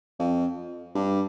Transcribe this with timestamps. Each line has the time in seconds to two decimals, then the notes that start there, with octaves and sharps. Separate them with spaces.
0.19 F2
0.95 G2